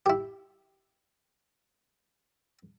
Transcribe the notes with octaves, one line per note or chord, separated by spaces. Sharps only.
E4 G4